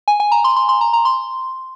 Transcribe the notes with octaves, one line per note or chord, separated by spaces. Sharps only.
G#5
G#5
A#5
C6
C6
C6
A#5
A#5
C6